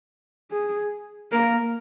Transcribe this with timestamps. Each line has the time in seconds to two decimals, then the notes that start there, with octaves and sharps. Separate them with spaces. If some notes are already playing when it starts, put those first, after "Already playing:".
0.51 G#4
1.32 A#3 A#4